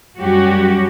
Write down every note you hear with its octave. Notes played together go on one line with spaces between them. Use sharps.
F#2 F#3 G3 C#4 F#4 G4